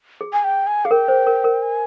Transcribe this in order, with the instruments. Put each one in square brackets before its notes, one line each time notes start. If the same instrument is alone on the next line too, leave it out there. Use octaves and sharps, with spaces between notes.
[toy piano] G#4
[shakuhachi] G#5
G5
G#5
[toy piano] G#4 [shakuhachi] F5
[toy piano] A#4 [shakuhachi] G5
[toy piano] C5
A#4
A#4
[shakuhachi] G#5